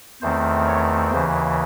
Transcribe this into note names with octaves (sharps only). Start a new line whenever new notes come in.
E2 D#3 A3 C4 C5
C#5
D#2 C#3 E3 C5